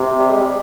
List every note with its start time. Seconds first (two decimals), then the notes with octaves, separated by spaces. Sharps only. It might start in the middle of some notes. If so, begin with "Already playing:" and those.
Already playing: C3
0.19 G3
0.30 G#3
0.41 G3